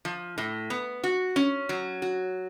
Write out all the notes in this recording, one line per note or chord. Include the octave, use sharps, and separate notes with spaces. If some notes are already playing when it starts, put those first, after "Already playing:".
F3
A2
B3
F#4
C#4
F#3
F#4